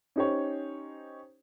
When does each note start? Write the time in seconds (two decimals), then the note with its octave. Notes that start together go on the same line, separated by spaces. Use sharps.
0.16 C#4 D#4 G4 C5 C#5